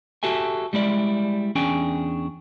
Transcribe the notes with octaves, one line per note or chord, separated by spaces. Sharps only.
F#4 G4 A4 E5 G#5
G3 G#3 E4 D5
E2 C#4 D4 G#4 G5 G#5